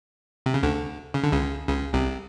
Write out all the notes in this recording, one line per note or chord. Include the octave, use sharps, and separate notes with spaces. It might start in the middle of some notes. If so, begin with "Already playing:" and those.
C3
C#3
D2 D3
C#3
D3
C#2 C#3
C#2 C#3
C2 C3